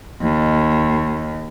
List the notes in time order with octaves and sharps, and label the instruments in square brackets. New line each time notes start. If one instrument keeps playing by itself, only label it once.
[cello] D#2